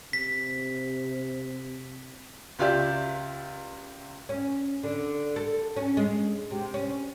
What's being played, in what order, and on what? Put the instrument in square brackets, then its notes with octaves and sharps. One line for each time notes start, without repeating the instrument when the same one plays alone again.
[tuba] C3 [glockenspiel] B6
[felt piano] C#2 F4 G4 D5 E5 G6
[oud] C#4
D3
A4
C#4
G#3
C3
C#4